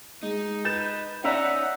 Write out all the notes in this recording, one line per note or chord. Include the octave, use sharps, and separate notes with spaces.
G#3 D#4
B4 G6 A6 E7
C#4 D#4 D5 E5 F#5 A#5